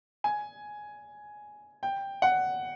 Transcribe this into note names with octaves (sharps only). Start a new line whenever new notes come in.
G#5
G5
F#5